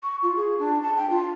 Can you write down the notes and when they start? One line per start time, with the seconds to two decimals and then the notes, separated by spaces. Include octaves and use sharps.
0.03 C#6
0.23 F4
0.36 G#4
0.59 D4
0.82 A5
0.97 G5
1.10 F4